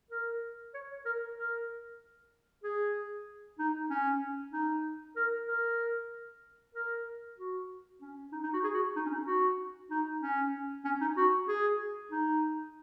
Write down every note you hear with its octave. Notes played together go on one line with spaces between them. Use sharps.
A#4
C#5
A#4
A#4
G#4
D#4
C#4
D#4
A#4
A#4
A#4
F#4
C#4
D#4
D#4
F#4
G#4
F#4
D#4
C#4
D#4
F#4
D#4
C#4
C#4
D#4
F#4
G#4
D#4